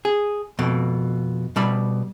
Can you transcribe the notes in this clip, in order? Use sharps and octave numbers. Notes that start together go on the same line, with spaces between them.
G#4
F2 B2
B2 G3 B5